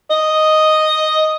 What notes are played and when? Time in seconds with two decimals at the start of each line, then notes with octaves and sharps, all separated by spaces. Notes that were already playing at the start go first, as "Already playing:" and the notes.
0.10 D#5